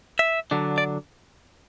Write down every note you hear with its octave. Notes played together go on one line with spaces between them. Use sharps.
E5
D3 F#3 D4
D5